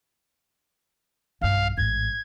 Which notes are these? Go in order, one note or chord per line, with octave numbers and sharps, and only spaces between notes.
B1 G2 F5
A1 G#2 G#6